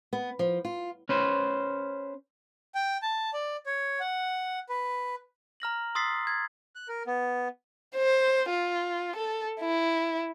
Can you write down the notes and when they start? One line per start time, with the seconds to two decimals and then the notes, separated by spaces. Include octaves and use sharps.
0.13 B3
0.39 F3
0.65 F4
1.09 C#4 B4 C5
2.75 G5
3.02 A5
3.34 D5
3.66 C#5
4.00 F#5
4.69 B4
5.60 A#5 F6 A#6 F#7
5.95 C6 D#6 E6 A6 B6 C7
6.27 G#6 A6
6.75 F#6
6.88 A#4
7.07 B3
7.96 C5
8.50 F4
9.16 A4
9.61 E4